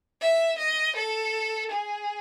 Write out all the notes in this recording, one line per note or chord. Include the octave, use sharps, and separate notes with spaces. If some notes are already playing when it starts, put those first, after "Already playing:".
E5
D#5
A4
G#4